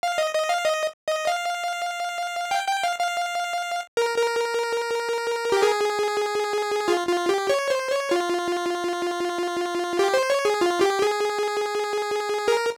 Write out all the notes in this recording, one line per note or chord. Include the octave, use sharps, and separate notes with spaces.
F5
D#5
D#5
F5
D#5
D#5
F5
G5
G5
F5
F5
A#4
A#4
G4
G#4
F4
F4
G4
C#5
C5
C#5
F4
G4
C5
C#5
G#4
F4
G4
G#4
A#4